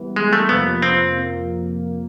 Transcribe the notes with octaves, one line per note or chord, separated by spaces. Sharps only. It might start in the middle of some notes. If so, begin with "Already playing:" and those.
Already playing: E3 G3 B3
G#3
A3
F2 C3 F3 A#3 B3
C4